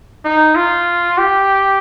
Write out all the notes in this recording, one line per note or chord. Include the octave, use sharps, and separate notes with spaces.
D#4
F4
G4